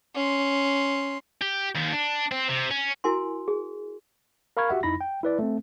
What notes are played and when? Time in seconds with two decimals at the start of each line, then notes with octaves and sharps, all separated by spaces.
0.15 C#4 C6
1.42 G4
1.75 D#2 D#3
1.92 D4
2.31 C4
2.49 C3
2.71 C#4
3.04 E4 F#4 A#4 G#5 C6
3.48 G#4
4.57 A#4 F5 B5 C#6 F6 G#6
4.69 F#4 G4 E5 F#5
4.83 F2 D#4 E4 B5 A#6
5.01 G5
5.23 E4 B4 D5
5.39 A3 C4